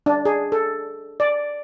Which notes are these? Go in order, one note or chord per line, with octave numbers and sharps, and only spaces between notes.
D4
G#4
A4
D5